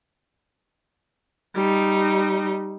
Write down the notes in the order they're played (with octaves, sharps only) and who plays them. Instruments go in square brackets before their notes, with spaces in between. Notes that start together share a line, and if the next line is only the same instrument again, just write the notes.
[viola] G3 D#4